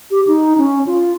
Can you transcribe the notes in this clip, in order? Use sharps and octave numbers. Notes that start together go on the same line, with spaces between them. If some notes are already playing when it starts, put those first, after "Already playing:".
G4
D#4
C#4
F4